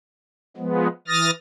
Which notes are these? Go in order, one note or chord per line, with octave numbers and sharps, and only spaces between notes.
F3 G#3 B3
E3 D#6 F6 A6 A#6